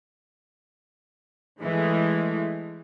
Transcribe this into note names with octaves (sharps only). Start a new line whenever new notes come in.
E3 G#3 A3